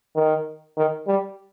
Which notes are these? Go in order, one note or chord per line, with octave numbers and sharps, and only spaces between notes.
D#3
D#3
G3